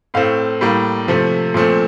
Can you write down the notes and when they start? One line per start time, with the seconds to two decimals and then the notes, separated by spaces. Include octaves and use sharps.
0.14 A2 A3 C4 F5
0.61 A2 G3 A#3
1.08 C3 F3 A3
1.54 A#2 F3 A3 C4